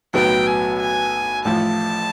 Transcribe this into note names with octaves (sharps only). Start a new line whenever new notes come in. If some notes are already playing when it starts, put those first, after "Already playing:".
B1 A2 F#3 B3 G5
G#5
G#5
A1 A2 F3 A5